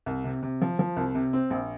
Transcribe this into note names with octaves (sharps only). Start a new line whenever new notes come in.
C2
C3
C3
F3
F3
C2
C3
C4
A#1